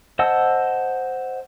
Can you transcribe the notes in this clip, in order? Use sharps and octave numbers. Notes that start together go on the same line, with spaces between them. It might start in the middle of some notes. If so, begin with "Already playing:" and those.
C5 D#5 F#5 A5 E6